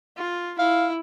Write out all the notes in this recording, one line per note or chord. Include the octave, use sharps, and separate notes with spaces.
F4
E4 F5